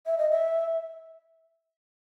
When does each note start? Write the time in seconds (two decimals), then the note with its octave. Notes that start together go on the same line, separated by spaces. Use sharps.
0.06 E5
0.18 D#5
0.31 E5